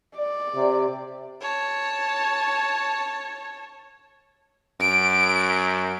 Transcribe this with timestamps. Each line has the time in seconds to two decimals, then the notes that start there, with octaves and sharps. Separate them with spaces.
0.17 D5
0.55 C3
1.41 C#5 A5
4.81 F#2 D7